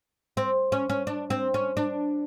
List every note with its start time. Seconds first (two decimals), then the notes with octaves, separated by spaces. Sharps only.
0.37 C4
0.72 C#4
0.89 C#4
1.07 D4
1.30 C4
1.54 C#4
1.77 D4